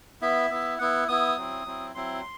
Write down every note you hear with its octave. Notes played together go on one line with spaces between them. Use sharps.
B3 E4 E5
B3 E4
B3 E4 F#5
B3 E4 D#6
F#3 C4 E4
F#3 C4 E4
F#3 C4 E4 C6